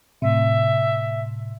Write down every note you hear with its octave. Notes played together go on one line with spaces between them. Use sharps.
A2 C3 E5